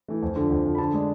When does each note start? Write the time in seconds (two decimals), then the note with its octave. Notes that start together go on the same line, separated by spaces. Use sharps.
0.08 E3 A3
0.22 F2
0.36 D3 F3
0.51 F2
0.65 D3 F3
0.75 B5
0.78 D3 A5
0.94 G#3 D4